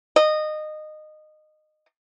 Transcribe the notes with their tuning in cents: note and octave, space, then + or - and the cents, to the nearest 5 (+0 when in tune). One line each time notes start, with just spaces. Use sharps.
D#5 -20